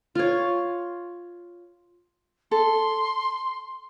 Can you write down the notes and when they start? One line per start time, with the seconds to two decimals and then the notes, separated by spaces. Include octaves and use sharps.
0.15 F4 C#5
2.51 A4 C6